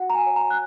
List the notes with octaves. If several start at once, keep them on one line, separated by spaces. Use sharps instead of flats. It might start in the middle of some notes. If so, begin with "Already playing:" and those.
Already playing: F#4 F#5
A#5
G#5
C#5
A#5
F#6